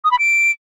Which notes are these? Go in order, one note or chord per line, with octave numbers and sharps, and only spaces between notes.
D#6
B5
D7